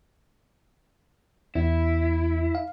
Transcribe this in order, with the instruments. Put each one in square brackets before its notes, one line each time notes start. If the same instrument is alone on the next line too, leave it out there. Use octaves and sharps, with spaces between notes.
[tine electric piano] E2 [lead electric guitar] E4
[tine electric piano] F5